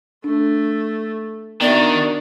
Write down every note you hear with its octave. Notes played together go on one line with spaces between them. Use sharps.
A3 D4
D#3 B3 D4 F#4 A#4 D5 E5